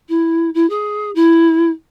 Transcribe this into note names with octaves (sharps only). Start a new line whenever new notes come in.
E4
E4
G#4
E4